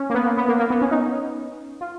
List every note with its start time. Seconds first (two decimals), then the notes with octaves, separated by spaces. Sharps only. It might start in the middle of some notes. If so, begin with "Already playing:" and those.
Already playing: C#4
0.10 A#3
0.14 B3
0.26 A#3
0.37 B3
0.48 A#3
0.59 A#3
0.70 B3
0.82 C#4
0.91 D#4
1.81 F4